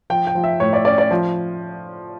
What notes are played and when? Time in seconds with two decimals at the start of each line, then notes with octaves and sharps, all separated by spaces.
0.10 F3 G5
0.27 G5
0.35 F3
0.44 E5
0.60 A2 C#5
0.73 D5
0.85 C#4 D5
0.98 D5
1.11 F3